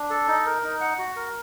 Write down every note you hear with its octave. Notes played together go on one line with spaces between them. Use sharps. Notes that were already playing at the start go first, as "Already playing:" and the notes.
Already playing: D4
A4
D#4
A#4
D#4
F#5
F#4
A#4